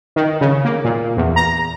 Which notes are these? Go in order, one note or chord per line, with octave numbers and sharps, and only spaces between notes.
D#3
C#3
A#3
A#2
E2
A#5